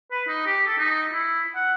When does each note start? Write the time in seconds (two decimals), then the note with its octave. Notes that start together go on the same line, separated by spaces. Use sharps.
0.11 B4
0.28 D#4
0.46 G4
0.67 A4
0.78 D#4
1.13 E4
1.55 F#5